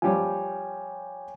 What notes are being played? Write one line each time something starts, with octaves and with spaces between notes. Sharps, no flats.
F3 G3 C#5 G5 G#5